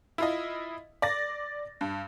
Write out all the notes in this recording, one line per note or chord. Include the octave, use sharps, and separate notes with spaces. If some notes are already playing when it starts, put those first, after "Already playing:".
E4 F4 D#5
D5 A6 A#6
G2